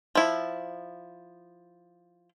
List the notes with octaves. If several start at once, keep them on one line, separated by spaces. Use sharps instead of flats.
F3 E4